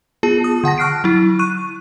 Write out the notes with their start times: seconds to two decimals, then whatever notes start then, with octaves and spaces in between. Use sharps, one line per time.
0.23 B3 F4 G#4 A5
0.44 D#6
0.64 D3 F#5 A5 A#6
0.78 C#6 F6 F#6 C7 D7
1.04 F#3 E4
1.39 C#6 F#6 D#7